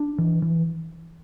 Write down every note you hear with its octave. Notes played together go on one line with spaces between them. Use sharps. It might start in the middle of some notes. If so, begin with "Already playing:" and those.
Already playing: D4
E3
E3